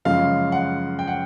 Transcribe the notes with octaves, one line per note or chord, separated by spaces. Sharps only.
F#2 C#3 F3 G#3 F5
F#5
G5
F#5